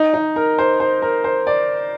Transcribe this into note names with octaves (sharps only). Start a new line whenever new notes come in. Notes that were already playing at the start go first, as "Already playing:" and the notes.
Already playing: D#4
D#4
A#4
C5
C5
A#4
C5
D5